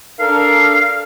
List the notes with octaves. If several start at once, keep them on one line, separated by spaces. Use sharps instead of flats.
D4 A4 A#4 F5